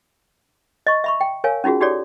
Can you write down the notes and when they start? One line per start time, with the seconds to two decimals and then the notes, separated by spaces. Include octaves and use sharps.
0.87 D#5 C#6
1.04 E5 B5 C#6
1.21 G5
1.44 A#4 C#5 F5 G#5
1.64 C#4 D#4 F4 F#4 G#4
1.81 D#4 F#4 G4 A4 C#5 D5